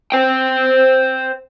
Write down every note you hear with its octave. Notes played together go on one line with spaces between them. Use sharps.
C5 G5